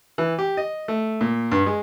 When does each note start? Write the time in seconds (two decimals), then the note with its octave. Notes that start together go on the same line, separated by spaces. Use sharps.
0.18 E3
0.39 G4
0.57 D#5
0.88 A3
1.21 A#2
1.52 G2
1.66 G#3